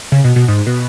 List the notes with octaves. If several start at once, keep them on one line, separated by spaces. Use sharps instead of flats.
C#3
B2
B2
G#2
B2